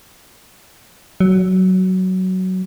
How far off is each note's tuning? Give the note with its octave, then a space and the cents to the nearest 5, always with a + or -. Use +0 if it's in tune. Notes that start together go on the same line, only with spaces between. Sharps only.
F#3 +10